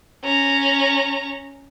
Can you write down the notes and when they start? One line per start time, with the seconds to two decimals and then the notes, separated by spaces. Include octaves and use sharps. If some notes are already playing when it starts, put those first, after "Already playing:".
0.25 C#4 A#5